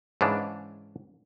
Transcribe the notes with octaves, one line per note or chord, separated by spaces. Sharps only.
G#2 C#3 E3 D4